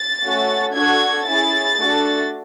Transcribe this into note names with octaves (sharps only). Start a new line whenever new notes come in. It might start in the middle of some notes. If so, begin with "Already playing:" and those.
Already playing: A6
A3 C#4 F#4 A4
D4 F#4 A4 G#6
C#4 E4 G#4 A6
A3 D4 F#4 A4